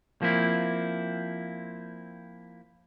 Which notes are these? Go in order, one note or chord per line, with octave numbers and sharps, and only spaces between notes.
F3 A#3 C4 E4